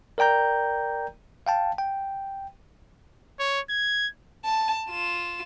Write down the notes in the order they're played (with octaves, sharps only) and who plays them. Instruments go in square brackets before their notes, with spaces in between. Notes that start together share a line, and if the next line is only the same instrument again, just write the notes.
[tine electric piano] A#4 D5 G5 A#5 G6
F5 G5 A5
G5
[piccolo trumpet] C#5
G#6
[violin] A5
F4 E7